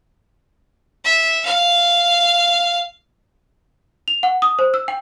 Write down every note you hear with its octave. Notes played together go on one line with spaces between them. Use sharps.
E5
F5
F7
F#5
D#6
C5
E6
G5